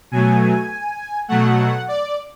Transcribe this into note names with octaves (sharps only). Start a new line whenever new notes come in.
B2 F#3 A3 G#5
B2 F#3 A3 F#5
D5